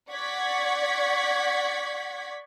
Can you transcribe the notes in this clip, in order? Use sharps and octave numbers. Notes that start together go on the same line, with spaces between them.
D5 F#5 C#6 G#6 B6